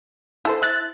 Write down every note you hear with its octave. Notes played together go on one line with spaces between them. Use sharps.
E4 A4 C5
E5 F#6 A6